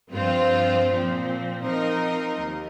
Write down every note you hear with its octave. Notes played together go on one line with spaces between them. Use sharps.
G2 F3 C4 F4
A#2 F3 C4
F3 C4 D#4 A#4 D#5
D#2